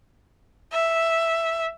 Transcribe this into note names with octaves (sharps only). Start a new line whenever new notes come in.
E5